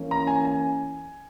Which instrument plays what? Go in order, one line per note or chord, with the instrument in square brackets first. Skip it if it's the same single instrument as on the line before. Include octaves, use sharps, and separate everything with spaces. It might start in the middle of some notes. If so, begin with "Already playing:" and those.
Already playing: [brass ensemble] E3 A#3 C#4
[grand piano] A#5
G#5
G#5